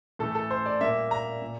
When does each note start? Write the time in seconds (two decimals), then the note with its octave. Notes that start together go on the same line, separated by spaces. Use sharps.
0.19 A2 E3 A3 A4
0.35 A4
0.51 C5
0.66 D5
0.80 A#2 G3 A#3 E5
1.11 A#5
1.42 A#2